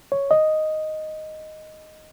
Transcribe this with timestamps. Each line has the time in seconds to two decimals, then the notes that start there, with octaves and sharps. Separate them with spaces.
0.12 C#5
0.31 D#5